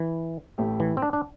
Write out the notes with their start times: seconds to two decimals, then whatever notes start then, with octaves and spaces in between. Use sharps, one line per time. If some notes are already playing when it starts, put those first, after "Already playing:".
Already playing: E3
0.58 A1 A2 A3 E4 G4
0.80 E3
0.97 C4
1.02 D4
1.13 D4